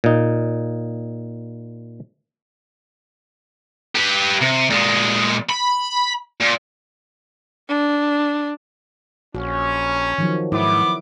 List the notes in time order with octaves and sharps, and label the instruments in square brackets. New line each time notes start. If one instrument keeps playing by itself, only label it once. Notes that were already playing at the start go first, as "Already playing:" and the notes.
[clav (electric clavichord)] A#2 D#4
[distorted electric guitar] G4 B4
C3
A#2 G#3
B5
A#2
[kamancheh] D4
[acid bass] A#1 [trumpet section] C#4 [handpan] F#4
[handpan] D#3 F3 F#3
[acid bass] G#2 [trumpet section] B3 D6 [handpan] E4